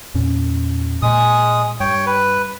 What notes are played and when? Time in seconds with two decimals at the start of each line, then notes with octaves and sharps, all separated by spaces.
0.14 E2 A#2 C#4
1.02 A#2 G#3 D#6
1.80 G2 C#5 G5
2.06 B4